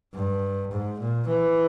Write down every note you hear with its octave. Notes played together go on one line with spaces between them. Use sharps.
G2
G#2
A#2
E3